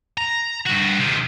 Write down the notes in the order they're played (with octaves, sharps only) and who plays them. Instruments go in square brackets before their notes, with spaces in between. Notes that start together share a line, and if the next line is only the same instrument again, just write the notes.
[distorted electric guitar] A#5
G2 F#4
C3 D#3